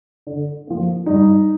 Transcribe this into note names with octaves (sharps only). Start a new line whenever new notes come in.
D3
F3 A#3
G2 D#4